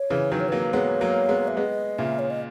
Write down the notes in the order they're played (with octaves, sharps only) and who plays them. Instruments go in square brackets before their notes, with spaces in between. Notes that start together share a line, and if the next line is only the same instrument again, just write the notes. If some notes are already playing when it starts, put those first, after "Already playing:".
Already playing: [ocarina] C#5
[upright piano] C#3 E3
[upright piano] D#3 F#3 [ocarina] B4
[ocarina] C#5
[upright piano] F#3 A#3 [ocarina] B4
[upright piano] G#3 B3 [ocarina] C#5
[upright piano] F#3 A#3
G#3 B3
[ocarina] E5
[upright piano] G#3 B3 [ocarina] D#5
[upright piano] A#2 C#3 [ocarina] E5
[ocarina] C#5
D#5